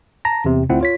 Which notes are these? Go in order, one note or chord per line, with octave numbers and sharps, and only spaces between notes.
A5 A#5 A#6
E2 C3
D2 C4 E4 F4 F#5
F4 C#5 B6